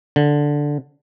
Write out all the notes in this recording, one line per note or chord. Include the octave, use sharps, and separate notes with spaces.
D3